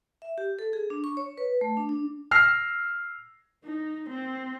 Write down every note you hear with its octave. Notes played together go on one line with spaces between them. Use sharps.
E5
G4
A4
G#4
D4
C#6
C#5
B4
A3
D4
D4
E6 F6 A#6 C7
D#4
C4